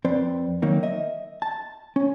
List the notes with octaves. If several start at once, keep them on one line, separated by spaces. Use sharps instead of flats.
F2 C4 B4 C5 D5
D#3 F#3 A#3 D#4
D#5 E5
A5
C#4